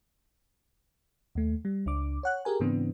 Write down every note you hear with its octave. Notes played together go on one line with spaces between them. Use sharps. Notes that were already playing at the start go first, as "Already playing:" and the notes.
D#2 A3
G3
C#2 D4 D6
C#5 F#5 F#6
G4 G#4 A#4 G#5
G#2 C#3 E3 B3 C4 D4